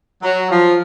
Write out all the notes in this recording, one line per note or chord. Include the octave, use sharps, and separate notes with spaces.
F#3
F3